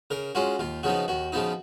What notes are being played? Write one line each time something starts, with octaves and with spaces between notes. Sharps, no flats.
C#3 A#4
G#3 C#4 F4 F#4
D#2 F4
C#3 F3 B3 D#4 F#4
D#2 F#4
C#3 F3 B3 D#4